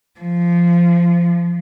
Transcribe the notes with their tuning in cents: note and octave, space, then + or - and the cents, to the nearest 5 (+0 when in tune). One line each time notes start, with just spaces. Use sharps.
F3 -15